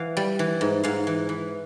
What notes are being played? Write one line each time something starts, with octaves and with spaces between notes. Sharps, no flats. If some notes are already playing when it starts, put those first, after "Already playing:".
Already playing: E3 F5
G3
E3
G#2
G#2 F5
E3
E3